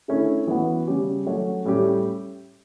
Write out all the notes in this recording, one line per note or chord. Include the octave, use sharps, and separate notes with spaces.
D3 A3 C#4 E4
E3 B3 F#4
C#3 G3 C#4 G4
F#3 A3 C#4 F#4
A2 G3 C#4 G4